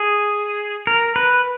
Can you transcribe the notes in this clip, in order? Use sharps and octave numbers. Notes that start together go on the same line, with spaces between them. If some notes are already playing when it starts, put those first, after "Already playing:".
Already playing: G#4
A#4
B4